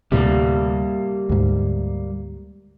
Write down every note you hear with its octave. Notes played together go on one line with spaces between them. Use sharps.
D2 A2 C3 G3 A#3
D2 G#2